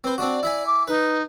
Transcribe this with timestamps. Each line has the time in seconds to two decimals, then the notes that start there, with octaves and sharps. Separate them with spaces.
0.04 C4 B4 C5
0.18 C4 D4 F#4 D5
0.43 E4 E5 G#5
0.66 D6
0.88 D#4 B4